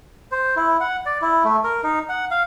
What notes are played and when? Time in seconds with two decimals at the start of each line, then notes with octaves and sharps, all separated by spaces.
0.32 C5
0.56 E4
0.80 F#5
1.06 D5
1.22 E4
1.44 A3
1.64 A#4
1.84 D#4
2.09 F#5
2.31 F5